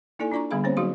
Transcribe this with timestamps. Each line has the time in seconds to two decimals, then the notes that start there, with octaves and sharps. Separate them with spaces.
0.19 A#3 D#4 E4 A4 D5 G#5
0.32 D4 F4 D5 A#5 C#6
0.51 D3 G3 B3 G#4 F5 B5
0.64 A#3 C4 C#4 C5 C#5
0.77 F#3 D#4 F#4 G#4 F5 C6